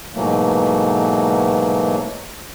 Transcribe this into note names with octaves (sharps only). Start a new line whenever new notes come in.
G#2 B2 E3 F#3 A3 A#3